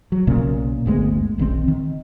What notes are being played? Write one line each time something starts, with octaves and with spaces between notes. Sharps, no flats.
F#3
B1 A#2 C#3 A#3
G1 D2 G#3 B3
D#1 A#1 D#3 C4
D#3